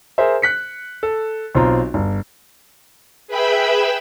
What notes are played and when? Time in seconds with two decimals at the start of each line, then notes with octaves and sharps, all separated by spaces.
0.18 G#4 A#4 C5 E5
0.42 F#6 B6 C#7
1.03 A4
1.55 B1 C4 F4 A#5
1.94 G1
3.27 G#4 B4 E5 G5 B5 E6